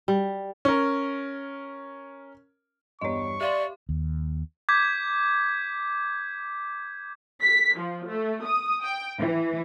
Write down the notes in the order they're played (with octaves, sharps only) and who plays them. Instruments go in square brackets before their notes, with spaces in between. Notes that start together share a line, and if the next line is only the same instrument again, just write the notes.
[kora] G3
[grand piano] C#4 A#4
[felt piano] G1 E2 G3 [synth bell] C#5 D#5 [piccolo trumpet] C#6
[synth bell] G4 F5 C6 [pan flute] D5 [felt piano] E5
[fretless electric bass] D#2
[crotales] D6 G6 G#6 B6
[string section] B6
F3
A3
D#6
G5
E3